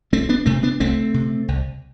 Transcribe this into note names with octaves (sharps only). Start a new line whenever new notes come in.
C2 A3 C4
B3 D4
C3 A3 C4
B3 D4
C2 A3 C4
C3
C2